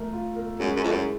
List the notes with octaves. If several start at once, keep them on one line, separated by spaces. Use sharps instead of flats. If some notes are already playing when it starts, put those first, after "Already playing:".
Already playing: A3 A#4
F4
A#4
F#2 G#3
F#2
F2 E4
F#2